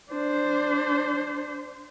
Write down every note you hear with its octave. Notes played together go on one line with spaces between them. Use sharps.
D4 C5